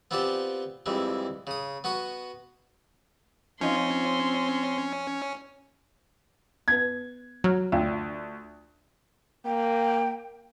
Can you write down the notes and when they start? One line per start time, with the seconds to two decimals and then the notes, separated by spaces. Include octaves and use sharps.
0.11 B3 C4 F4 G4 D5 A5
0.86 F2 E3 G3 G#3
1.47 C#3 D#6
1.84 B3 F#4 C#6 D#6
3.61 F3 C4 C#4 D#4 F4 C6
6.68 B3 B4 G#6
7.44 F#3 A#5 F6
7.72 D2 F4 F5 G5
9.45 A#3 G5